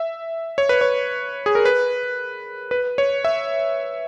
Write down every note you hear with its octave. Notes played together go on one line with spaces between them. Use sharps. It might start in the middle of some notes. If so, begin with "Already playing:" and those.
Already playing: E5
C#5
B4
C#5
G#4
A#4
B4
B4
C#5
E5